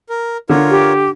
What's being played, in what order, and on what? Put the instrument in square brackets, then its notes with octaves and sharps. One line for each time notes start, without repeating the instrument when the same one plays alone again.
[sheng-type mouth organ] A#4
[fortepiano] D3 [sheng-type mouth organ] F4 A#4 C#5
[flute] G4